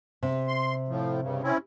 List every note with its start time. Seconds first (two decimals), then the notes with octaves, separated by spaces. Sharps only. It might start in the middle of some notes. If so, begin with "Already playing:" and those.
0.23 C3
0.48 C6
0.88 A2 F3
1.21 G2 C#3
1.43 C4 C#4 E4